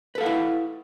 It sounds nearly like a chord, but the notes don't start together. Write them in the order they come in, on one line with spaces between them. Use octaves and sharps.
B4 A4 F5 F#5 E4